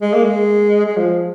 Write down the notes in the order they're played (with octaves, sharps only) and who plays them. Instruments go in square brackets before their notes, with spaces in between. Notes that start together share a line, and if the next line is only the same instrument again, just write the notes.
[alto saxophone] G#3
A#3
G#3
G#3
F3